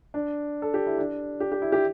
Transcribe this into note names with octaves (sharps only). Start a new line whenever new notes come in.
D4
A4
G4
E4
D4
G4
G4
E4
G4